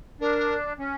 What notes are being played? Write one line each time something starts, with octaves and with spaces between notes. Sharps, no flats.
D4 A#4
C#4